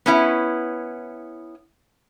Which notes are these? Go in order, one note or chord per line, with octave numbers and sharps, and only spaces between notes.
B3 C#4 E4